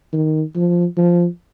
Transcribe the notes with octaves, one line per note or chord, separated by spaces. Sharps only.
D#3
F3
F3